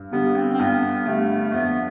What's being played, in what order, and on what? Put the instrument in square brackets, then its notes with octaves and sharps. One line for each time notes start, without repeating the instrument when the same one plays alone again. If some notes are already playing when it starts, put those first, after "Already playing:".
Already playing: [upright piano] G2
[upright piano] D3 G3 [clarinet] B3
[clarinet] C4
C4
[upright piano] G2 [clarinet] B3
[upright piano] D3 G3 [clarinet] A3
[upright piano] F2 [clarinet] B3